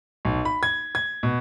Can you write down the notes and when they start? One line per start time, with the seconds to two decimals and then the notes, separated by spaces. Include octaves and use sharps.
0.25 B1
0.45 B5
0.63 G#6
0.95 G#6
1.23 B2